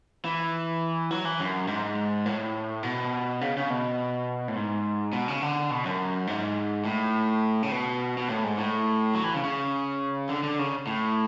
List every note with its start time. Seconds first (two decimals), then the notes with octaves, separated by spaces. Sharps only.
0.25 E3
1.11 F#3
1.25 E3
1.40 F#2
1.68 G#2
2.26 A2
2.83 B2
3.41 C#3
3.57 C#3
3.70 B2
4.48 A2
4.56 G#2
5.13 B2
5.28 C#3
5.42 D3
5.71 B2
5.85 F#2
6.27 G#2
6.85 A2
7.63 C#3
7.72 B2
8.18 B2
8.29 A2
8.44 G#2
8.58 A2
9.15 F#3
9.24 E3
9.34 C#3
9.44 C#3
10.29 D3
10.43 D3
10.59 C#3
10.87 A2